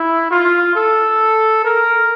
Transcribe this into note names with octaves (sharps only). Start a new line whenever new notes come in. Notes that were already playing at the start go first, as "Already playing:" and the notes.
Already playing: E4
F4
A4
A#4